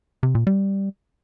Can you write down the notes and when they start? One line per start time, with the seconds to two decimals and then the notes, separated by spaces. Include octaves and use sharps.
0.23 C3
0.35 A#2
0.47 G3